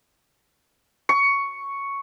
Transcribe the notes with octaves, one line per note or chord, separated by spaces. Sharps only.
C#6